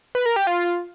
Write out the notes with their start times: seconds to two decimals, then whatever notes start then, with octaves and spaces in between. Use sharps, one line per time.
0.15 B4
0.26 A#4
0.36 G4
0.47 F4